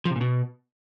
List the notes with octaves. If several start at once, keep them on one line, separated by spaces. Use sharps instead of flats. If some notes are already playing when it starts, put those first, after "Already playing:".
F3
C3
A#2
B2